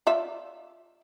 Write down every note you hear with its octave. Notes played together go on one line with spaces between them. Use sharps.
F4 D5 E5